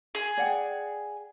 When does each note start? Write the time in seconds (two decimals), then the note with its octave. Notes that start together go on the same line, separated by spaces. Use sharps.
0.15 G#4
0.37 D5 F#5 G5